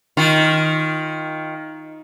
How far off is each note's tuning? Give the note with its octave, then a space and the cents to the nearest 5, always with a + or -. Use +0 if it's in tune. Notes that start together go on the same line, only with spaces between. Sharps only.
D#3 +10 F4 +0